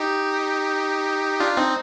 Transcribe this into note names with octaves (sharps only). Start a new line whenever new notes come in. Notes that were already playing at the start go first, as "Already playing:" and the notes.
Already playing: D#4 G4
D4 F4
C4 D#4